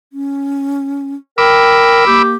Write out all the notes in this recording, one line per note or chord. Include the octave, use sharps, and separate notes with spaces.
C#4
A#4 G5 B5 D6 E6
A#3 G4